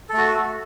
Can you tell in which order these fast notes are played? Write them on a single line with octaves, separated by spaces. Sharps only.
A4 A3 F#4